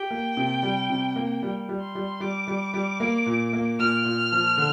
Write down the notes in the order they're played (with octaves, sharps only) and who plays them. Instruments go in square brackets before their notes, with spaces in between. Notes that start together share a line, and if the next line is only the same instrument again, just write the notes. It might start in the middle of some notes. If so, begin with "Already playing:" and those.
Already playing: [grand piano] G4 [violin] G5
[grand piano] A#3
C3
G3
C3
A#3
G3
G3
[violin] C6
[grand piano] G3
[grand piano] G3 [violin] D6
[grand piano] G3
G3
A#3
A#2
A#3
[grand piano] A#2 [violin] F6
[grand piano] A#2
F3
D3